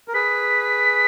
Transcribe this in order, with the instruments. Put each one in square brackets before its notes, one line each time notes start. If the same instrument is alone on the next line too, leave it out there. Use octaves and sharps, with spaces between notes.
[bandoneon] A#4
[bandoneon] G#4 B4 [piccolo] B6